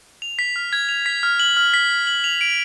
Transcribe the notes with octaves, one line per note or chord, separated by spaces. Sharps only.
F7
B6
F6
G#6
F7
B6
F6
F#7
F6
B6
F6
F#7
F7
D7